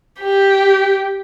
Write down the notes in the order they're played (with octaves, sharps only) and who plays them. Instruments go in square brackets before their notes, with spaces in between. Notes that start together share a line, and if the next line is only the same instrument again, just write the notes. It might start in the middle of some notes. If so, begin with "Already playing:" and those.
[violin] G4